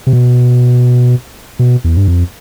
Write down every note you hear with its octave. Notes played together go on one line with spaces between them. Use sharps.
C3
B2
B2
E2
G2
F2